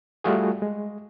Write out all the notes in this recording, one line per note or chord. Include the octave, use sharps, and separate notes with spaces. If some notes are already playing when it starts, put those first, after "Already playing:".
G3 A3 F4 F#4 G#4
G#3